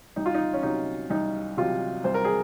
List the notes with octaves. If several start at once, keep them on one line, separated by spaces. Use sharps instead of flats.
C2 D#4
F4
D#4
C#4
C3 F#3 D#4
C2 D#4
C3 F#3 F4
C2 C5
A#4
G#4